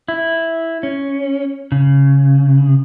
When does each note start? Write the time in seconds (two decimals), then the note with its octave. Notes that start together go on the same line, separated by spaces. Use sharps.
0.08 E4
0.83 C#4
1.72 C#3